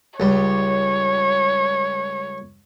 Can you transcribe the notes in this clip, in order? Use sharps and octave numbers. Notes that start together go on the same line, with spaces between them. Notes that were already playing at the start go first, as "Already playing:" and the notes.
C#2 G3 C#5